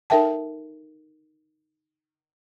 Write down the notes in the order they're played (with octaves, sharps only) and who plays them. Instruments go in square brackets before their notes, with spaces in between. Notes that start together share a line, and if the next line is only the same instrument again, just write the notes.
[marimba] D#4 A4 A#4 E5 G5 A5